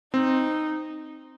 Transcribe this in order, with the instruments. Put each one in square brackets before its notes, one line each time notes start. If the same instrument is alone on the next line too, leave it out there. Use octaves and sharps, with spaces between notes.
[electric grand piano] C4 [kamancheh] D#4